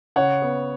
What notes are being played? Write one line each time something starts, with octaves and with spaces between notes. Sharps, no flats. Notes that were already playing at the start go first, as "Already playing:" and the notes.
C#3 C#5 F#5
B3